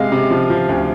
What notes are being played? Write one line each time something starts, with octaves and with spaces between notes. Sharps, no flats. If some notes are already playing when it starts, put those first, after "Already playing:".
Already playing: C3 G#3 F5
C3
F3
F3
D2